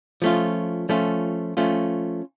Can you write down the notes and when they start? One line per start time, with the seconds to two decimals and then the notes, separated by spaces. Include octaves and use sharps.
0.22 F3 A3 C#4 F4
0.89 F3 A3 C#4 F4
1.57 F3 A3 C#4 F4